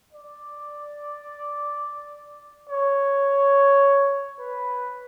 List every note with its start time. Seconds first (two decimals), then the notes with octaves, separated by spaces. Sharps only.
0.13 D5
2.69 C#5
4.40 B4